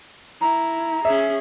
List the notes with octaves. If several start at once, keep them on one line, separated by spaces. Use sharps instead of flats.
E4 A#5
C#4 G#4 E5